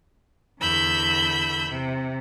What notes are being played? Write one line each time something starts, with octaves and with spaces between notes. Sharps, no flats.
E2 D3 B5 E6 G6
C3